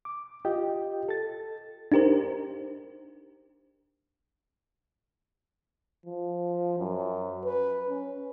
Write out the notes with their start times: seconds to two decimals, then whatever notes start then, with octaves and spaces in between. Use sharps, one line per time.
0.05 D6
0.45 F4 G4 D#5 G5
1.09 A4 A6
1.92 D4 D#4 G4 A#4 C5
6.06 F3
6.78 F#2
7.45 B4
7.89 C#4